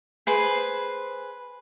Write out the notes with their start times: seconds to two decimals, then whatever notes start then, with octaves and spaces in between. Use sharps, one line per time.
0.27 G#4 B4 C5